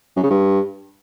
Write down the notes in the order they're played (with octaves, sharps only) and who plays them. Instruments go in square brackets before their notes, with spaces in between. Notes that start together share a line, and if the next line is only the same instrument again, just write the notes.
[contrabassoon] F#2
C#3
G2